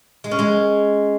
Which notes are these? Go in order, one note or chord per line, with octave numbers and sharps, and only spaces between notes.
G#3
C#4
G#3